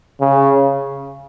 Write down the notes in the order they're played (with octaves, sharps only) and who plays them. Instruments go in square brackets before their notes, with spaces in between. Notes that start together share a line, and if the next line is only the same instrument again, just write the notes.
[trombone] C#3